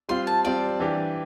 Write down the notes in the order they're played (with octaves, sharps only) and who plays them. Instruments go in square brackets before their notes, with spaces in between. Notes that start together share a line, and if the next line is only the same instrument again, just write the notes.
[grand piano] G3 C4 F4 [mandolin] C6
[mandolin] A5
[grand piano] G3 C4 F4 [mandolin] D5
[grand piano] E3 G3 D4 G4